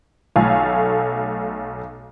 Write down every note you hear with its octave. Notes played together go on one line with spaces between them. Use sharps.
B1 A3 A4 F5 G#5